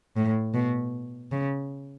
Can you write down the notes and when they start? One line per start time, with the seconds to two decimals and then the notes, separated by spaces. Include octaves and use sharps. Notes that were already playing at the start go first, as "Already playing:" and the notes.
0.16 A2
0.54 B2
1.32 C#3